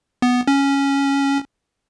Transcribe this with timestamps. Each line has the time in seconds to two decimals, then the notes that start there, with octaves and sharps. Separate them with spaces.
0.22 B3
0.48 C#4